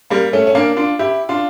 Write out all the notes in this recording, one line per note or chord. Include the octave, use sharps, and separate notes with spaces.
G3 A#3
A3 C#4
C#4
A#3 D4
D4 F4
E4 G4
D4 F4